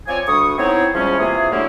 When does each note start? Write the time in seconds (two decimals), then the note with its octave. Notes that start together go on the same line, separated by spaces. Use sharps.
0.07 F3 C4 F4 C#5 D5 G#5
0.26 D2 G3 C#6 D#6
0.58 B3 C4 D#4 E4 G#4 C#5
0.94 E2 F3 G3 G#3 C#4
1.19 C3 E3 A#3 F4 G#4
1.51 D3 F#3 A3 A#3 C#4 E4